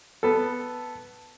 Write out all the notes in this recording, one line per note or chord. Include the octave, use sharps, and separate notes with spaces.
B3 A4